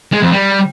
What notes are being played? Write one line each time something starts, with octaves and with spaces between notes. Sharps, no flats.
G#3
F2
G3